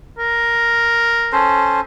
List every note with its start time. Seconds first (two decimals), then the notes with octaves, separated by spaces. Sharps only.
0.18 A#4
1.32 C#4 A4 C5